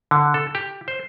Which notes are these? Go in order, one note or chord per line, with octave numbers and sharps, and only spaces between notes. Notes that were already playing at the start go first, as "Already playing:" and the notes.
D3
A4
G4
C5